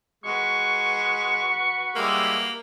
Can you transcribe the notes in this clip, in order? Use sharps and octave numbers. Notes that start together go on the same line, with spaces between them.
G#3 F#4 B4 C#6
G3 G#3 A#3 E4